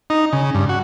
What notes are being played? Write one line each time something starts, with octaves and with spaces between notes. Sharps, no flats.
D#4
C#3
G2
F#4